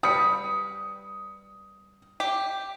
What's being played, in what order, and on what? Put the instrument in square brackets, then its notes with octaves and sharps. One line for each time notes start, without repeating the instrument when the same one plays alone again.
[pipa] G3 B4 [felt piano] D#6 C#7
[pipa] G4